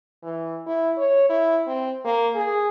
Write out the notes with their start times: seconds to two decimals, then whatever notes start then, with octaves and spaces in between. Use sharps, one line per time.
0.23 E3
0.67 E4
0.97 C#5
1.29 E4
1.67 C4
2.05 A#3
2.35 G#4